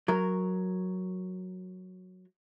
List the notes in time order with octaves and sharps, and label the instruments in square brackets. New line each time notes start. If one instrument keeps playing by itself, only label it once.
[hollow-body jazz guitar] F#3 A#4